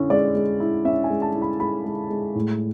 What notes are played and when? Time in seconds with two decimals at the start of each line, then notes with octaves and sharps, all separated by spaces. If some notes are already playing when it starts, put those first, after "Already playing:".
Already playing: D3 C#4 E4
0.10 G#3 D5
0.35 G#3
0.60 E4
0.85 C#4 E5
1.04 G#5
1.10 G#3
1.22 A5
1.35 E4
1.42 B5
1.60 G#3 B5
1.85 G#3
2.10 G#3
2.35 A2